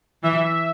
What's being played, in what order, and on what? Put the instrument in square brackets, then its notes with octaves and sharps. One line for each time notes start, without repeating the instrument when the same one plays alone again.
[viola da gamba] E3 [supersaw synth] E5